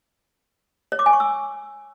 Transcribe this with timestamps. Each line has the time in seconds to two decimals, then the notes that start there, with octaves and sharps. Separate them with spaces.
0.92 C#5
0.99 D6
1.06 G#5
1.13 C#6
1.20 E6